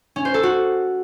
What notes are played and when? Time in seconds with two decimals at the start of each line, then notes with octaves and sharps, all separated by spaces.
0.16 C#4
0.25 C5
0.34 A4
0.43 F#4